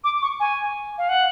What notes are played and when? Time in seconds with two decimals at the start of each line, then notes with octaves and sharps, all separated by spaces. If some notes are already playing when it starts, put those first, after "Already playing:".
0.04 D6
0.22 C#6
0.40 G#5
0.98 F5
1.09 F#5